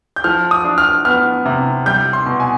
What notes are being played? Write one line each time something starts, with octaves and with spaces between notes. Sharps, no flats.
G6
F3 F6
D#6
D4
F6
B3 F6
C3
G3 G6
C6
B2
G#5